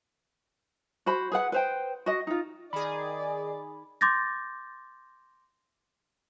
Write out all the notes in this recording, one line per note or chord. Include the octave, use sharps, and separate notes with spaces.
F#4 C5 B5
G#4 B4 F#5
B4 C5 G5
F#4 D#5
D#4 F4
D#3 G#4 D5 B5
C6 D6 G6 A6 A#6